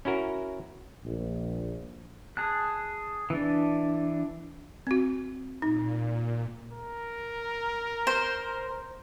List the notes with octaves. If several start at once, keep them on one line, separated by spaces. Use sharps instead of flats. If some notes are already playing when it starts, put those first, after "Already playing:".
C#4 E4 F#4 A#4
A#1
G#4 A5 F#6
E3 D4
C4 F#4
A#2 D#4
A#4
C5